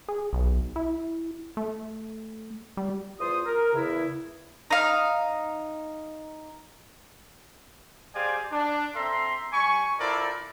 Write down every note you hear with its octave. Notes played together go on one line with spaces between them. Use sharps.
G#4
B1
E4
A3
G3
E2 F4 C5 D#6
A#4
E2 C#3 E4
D#4 F5
G4 G#4 C5 D5 F5 G#5
D4
C4 A4 E5 A#5 C6
G3 G#5 B5 C#6
E4 F4 A4 A#4 C5 D5